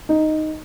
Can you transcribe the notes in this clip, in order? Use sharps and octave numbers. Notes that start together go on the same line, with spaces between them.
D#4